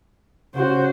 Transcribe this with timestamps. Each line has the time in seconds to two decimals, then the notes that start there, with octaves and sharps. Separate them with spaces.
0.55 C#3 F#4 C5